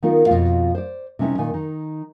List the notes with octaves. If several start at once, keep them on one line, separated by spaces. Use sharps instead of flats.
D#3 B3 D#4 F4 A#4
F2 B2 G#3 A3 F4 F5
C5 D5
C3 G3 C#4 D#4 E4 B4
A#2 D#3 G#5
D#3 D#4